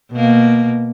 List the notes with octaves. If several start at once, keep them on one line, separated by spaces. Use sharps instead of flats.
B2 A#3